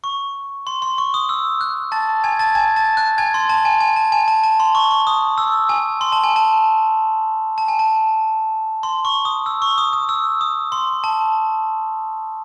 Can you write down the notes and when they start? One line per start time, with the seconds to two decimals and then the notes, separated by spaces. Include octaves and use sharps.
0.04 C#6
0.67 C6
0.82 C6
0.98 C#6
1.14 D#6
1.29 E6
1.61 F#6
1.92 A5 A6
2.24 G#5 G#6
2.39 A5 A6
2.55 G#5 G#6
2.76 A5 A6
2.97 F#6
3.18 G#5 G#6
3.34 C6
3.49 A5
3.65 G#5
3.80 G#5
3.96 A5
4.12 G#5
4.28 A5
4.43 A5
4.60 C6
4.75 C#6
4.91 C#6
5.07 D#6
5.38 E6
5.69 G#5
6.01 C6
6.12 A5
6.23 G#5
6.36 A5
7.58 A5
7.68 G#5
7.79 A5
8.83 C6
9.05 C#6
9.25 D#6
9.46 E6
9.62 C#6
9.78 D#6
9.93 D#6
10.09 E6
10.41 D#6
10.72 C6
11.04 A5